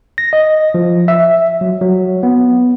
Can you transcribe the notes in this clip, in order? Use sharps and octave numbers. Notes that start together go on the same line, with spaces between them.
A#6
D#5
F3
E5
F#3
F#3
B3